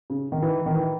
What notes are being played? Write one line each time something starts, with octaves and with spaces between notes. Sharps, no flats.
C#3
D#3
E3
D#3
E3